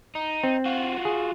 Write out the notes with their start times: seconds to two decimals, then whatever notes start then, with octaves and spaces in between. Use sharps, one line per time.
0.15 D#4
0.43 C4
0.66 F4 F#4
1.05 G#4